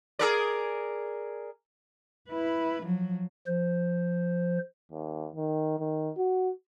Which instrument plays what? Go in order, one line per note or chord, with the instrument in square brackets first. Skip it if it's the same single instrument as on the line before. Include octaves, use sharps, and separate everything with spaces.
[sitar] G#4 A#4 D5
[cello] E4 B4
F3 F#3
[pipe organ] F3 C5
[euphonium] D#2
D#3
D#3
F#4